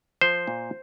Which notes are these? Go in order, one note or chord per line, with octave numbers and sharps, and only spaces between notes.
F3 C5
A#2